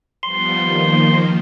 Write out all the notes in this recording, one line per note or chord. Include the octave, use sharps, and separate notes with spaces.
F3 G3 B3 C6
D#3 F3 A#3